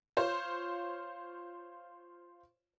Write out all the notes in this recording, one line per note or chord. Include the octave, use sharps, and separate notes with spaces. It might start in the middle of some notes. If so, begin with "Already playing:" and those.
F4 C5 C#5